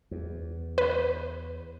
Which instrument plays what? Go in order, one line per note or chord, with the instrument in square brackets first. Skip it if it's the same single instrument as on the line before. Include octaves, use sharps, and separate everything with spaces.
[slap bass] E2
[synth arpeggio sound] B4